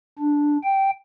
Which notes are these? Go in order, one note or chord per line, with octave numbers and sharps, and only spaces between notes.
D4
G5